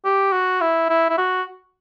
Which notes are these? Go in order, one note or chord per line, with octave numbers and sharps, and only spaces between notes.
G4
F#4
E4
E4
E4
F#4